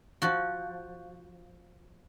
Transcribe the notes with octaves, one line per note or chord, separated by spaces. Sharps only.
F3 F#4